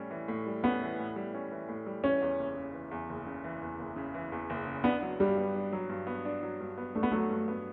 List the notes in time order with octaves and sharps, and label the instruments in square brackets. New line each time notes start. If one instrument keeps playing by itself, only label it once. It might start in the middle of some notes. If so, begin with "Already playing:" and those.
Already playing: [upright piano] A2 G3 C#4
E3
A2
G3
[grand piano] B3 [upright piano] C#4
[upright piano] E3
A2
G3
C#4
E3
A2
G3
[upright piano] E3 [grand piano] C#4
[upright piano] E2
F#1
C#3
E3
E2
F#1
C#3
E3
E2
F#1
C#3
E3
E2
F#1
C#3
[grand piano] B3 [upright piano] D4
[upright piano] F#3
[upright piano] G2 [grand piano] G3
[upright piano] B3
D4
F#3
G2
B3
D4
F#3
G2
B3
[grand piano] A3 [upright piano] D4
[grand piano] B3
[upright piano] F#3 [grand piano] A3
[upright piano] G2
B3